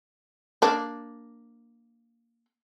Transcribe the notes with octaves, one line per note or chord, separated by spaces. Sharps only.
A#3 D4